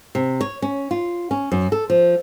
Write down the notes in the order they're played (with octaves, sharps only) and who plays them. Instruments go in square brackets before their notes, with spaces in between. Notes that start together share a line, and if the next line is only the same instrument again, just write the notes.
[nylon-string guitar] C3
C#5
C#4
F4
C#4
F#2
A4
F3